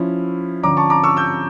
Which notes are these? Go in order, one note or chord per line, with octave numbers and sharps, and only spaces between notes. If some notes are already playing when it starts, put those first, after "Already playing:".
Already playing: F3 C#4 E4
D3 F3 C#4 A#5 D6
A5 C#6
A#5 D6
C#6 E6
E6 G6